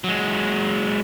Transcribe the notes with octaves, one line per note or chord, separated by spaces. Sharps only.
F#3 G#3